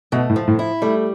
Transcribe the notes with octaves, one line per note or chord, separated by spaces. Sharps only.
B2 A3
A2
F3
A2
E4
G3 A3